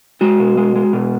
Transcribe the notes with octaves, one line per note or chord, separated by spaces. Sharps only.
G#3 F#4
B2
G#3
G#3
B2